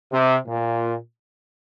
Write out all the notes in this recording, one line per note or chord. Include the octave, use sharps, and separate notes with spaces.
C3
A#2